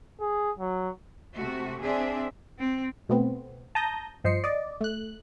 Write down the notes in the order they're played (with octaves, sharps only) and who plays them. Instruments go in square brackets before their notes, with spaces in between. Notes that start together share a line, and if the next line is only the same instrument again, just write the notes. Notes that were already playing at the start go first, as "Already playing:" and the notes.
[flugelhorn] G#4
F#3
[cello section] C3 A3 F#4
C4 D4 G#4 E5
[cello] C4
[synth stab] B2 A3 B3 C4
A5 A#5 D#6 G6 A#6
G2 F3 C5 D#5 C7 C#7
D5 D#5 D6
A3 F#6